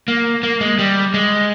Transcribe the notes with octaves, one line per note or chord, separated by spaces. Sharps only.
A#3
A#3
G#3
G3
G#3